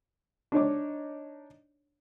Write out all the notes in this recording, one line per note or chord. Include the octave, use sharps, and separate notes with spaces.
D4 D#4 C#5 D6